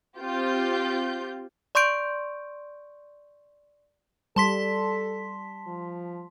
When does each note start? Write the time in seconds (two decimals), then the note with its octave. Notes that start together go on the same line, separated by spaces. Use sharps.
0.18 C4 F4 G4 G6
1.75 D5 C6 C#6 G6 D7
4.36 G3 A4 A5 C6 B6
5.67 F3